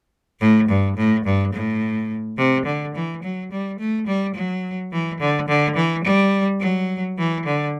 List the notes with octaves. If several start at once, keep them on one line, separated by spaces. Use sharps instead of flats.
A2
G2
A2
G2
A2
C3
D3
E3
F#3
G3
A3
G3
F#3
E3
D3
D3
E3
G3
F#3
E3
D3